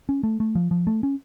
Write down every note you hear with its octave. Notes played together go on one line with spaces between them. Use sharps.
C#4
A3
A3
F3
F3
A3
C#4